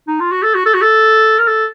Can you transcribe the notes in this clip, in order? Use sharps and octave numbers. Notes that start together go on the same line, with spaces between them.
D#4
F4
F#4
A4
F#4
A4
F#4
A4
A#4
A4